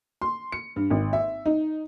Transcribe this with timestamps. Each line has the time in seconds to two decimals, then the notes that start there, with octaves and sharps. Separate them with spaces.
0.22 C6
0.52 C#7
0.76 G2
0.90 G#1
1.13 E5
1.46 D#4